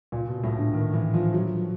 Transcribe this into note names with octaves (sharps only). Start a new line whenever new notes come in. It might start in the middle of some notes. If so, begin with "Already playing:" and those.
A#2
B2
A2
D3
D#3
E3
F3
F#3